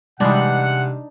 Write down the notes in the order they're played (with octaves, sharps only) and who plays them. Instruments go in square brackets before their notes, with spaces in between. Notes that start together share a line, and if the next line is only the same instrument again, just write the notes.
[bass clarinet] C3 [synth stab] E3 G3 G#3 [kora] D4 D#4 [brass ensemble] F#5